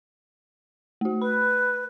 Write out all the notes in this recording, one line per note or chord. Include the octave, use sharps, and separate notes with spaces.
A3 F#4
B4 B5